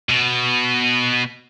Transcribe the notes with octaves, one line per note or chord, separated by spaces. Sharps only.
B2